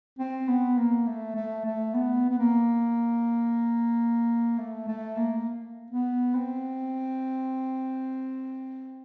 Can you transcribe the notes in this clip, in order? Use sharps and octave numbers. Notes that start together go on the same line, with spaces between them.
C4
B3
A#3
A3
A3
A3
B3
B3
A#3
A3
A3
A#3
B3
C4